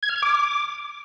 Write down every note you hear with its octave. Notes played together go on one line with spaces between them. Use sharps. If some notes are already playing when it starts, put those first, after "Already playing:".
G#6
F6
G#6
D6